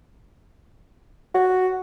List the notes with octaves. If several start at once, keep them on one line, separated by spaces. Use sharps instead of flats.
F#4